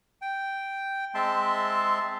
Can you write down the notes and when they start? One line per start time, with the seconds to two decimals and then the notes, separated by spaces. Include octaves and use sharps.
0.22 G5
1.15 G#3 C4 E5 A5 C6